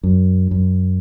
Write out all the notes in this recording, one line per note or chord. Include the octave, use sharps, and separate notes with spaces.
F#2
F#2